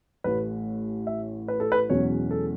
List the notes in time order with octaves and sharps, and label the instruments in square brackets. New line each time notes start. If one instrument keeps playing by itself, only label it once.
[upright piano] A1 A2 E3 [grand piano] B4
[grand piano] E5
B4
A4
B4
[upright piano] E1 E2 B2 F#3 C#4 [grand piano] C#5
[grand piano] A4